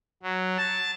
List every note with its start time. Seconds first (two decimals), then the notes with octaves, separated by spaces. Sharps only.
0.23 F#3
0.57 A5